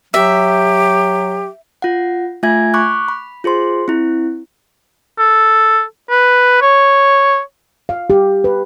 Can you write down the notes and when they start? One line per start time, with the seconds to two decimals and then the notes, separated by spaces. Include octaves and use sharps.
0.14 F#3 G4 E5
1.82 F4 F#5
2.43 A3 F4 E5 G#5 G#6
2.74 B5 C#6 D6 F#6
3.08 B5
3.44 F4 G#4 C5 C6
3.88 C4 E4
5.19 A4
6.10 B4
6.62 C#5
7.89 F5
8.10 G4
8.44 B4